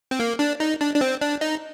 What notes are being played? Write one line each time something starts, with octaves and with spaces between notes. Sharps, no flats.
C4
A#3
D4
D#4
D4
D4
C4
D4
D#4